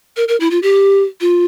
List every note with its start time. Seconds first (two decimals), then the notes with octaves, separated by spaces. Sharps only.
0.17 A#4
0.28 A#4
0.40 E4
0.51 F4
0.63 G4
1.21 F4